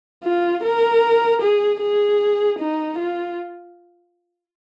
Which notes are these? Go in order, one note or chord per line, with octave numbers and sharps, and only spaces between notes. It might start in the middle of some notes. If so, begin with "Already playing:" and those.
F4
A#4
G#4
G#4
D#4
F4